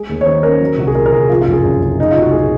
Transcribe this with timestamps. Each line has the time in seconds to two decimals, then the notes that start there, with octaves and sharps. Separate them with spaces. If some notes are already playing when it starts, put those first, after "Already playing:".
Already playing: G#3 G#4
0.09 D#2
0.21 C#5
0.26 D#3 C5
0.43 C#4 A#4
0.60 F#3
0.78 C2 F#4
0.87 G#4
0.95 A#2 A#4
1.06 A#4
1.12 C2 G#4
1.29 F3 F4
1.41 F4
1.47 F#1
1.53 G#4
1.64 F#2
1.81 F#1
1.98 G#3 D#4
2.11 C2 F4
2.22 F#4
2.33 A#2 G#4